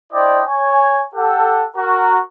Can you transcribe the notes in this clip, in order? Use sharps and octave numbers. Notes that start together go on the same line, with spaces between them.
D4 E4 C5 D5 D#5 G5
C#5 G#5
G4 A4 F#5
F#4 A#4